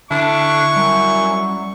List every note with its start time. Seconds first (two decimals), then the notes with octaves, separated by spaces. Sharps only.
0.11 D3 D4 E4 C#6
0.76 F#2 G3